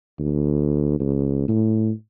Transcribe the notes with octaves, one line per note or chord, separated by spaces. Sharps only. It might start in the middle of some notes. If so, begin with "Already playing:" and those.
D2
C#2
A2